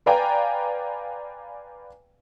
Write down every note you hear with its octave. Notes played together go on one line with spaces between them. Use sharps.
B4 D5 F5 G5 G#5 A#5